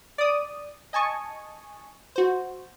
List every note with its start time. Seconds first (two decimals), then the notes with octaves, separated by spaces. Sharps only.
0.18 D5 D#6
0.93 D#5 G#5 A5 C#6
2.16 F#4 C5